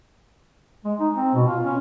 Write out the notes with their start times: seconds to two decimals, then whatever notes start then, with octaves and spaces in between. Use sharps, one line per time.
0.85 G#3
1.00 D#4
1.15 C4
1.34 B2
1.47 F4
1.63 C#4